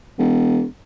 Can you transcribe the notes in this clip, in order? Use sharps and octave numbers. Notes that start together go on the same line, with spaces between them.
E1